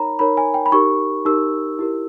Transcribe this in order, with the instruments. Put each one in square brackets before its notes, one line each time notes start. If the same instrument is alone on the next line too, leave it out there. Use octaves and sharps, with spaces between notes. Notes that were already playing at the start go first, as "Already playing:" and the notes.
Already playing: [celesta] D#4 A#4 C#5 A#5 B5
D#4 A#4 C#5 B5
G#5
G5
B5
D#4 G4 A#4 C#6
D#4 G4 A#4 E6
E4 G4 A#4